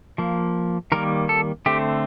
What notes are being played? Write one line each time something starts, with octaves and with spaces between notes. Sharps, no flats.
F3 A#3
D#3 G3 A#3 A#4
A4
D3 A3 C4 G4